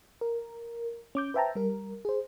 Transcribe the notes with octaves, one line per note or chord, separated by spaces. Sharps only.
A#4
C#4 D6 G6
B4 C5 E5 G5 A5 A#5
G3 A#4
G#4 C5